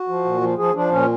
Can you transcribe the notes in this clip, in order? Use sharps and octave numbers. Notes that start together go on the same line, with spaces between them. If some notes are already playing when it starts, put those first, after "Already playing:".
Already playing: F#4
F3
A#2
F3
F3 G#4
F3 D4
A#2 C#4